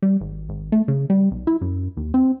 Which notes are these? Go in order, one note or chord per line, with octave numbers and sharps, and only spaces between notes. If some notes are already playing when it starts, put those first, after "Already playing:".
G3
G#1
G#1
A3
C#3
G3
B1
E4
F#2
D#2
C4